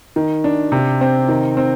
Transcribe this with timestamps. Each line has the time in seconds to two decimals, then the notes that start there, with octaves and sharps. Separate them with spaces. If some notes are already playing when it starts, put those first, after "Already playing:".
0.16 D#3
0.44 D4
0.72 C3
1.01 C4
1.28 D#3
1.57 C4